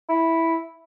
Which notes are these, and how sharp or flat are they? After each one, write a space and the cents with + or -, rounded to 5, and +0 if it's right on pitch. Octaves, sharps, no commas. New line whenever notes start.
E4 -5